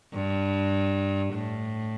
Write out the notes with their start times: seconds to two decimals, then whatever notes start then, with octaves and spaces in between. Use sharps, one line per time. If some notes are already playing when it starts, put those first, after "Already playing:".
0.13 G2
1.34 A2